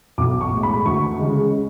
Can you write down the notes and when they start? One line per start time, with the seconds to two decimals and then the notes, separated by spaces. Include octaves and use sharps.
0.18 B1 D6
0.41 C#6
0.51 A2 G#3
0.63 B5
0.86 D2 C#6
1.19 C#3 G#3